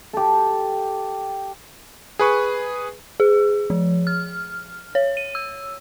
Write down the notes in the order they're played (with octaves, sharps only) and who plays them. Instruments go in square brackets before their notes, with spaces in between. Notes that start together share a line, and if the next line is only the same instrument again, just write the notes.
[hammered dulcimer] G4 A4
[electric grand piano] G#4 B4 C#6
[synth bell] G#4
F3
F6
C#5
D#7
E6